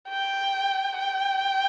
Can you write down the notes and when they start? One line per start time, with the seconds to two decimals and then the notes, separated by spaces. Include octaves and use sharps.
0.09 G5
0.98 G5